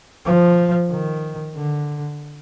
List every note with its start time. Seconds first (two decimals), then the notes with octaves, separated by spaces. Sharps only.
0.25 F3
0.90 D#3
1.55 D3